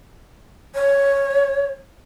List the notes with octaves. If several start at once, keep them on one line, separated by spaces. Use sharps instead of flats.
C#5